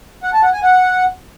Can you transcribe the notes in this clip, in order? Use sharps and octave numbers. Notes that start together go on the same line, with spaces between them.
F#5
A5
F#5
G#5
F#5